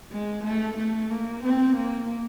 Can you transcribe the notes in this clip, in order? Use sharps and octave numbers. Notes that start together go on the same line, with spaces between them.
G#3
A3
A3
A#3
C4
A#3